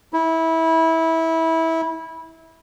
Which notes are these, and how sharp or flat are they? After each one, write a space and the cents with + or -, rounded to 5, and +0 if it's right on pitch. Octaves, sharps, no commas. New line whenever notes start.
E4 -20